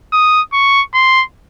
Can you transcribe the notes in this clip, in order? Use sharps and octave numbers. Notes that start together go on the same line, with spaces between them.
D#6
C#6
C6